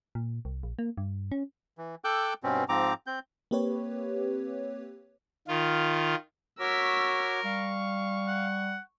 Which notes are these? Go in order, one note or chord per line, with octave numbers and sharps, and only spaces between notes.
A#2
C2
A#1
A#3
G2
C#4
E3
A4 G5 D6 E6 F#6 G6
G2 B2 C4 C#4
G#2 F3 C4 A#5 D6
C4 G6
A#3 C4 G4 B4 C#5
D#3 F4
F#4 A#4 C#5 D6 E6 B6
G3 F5 C#6
F#5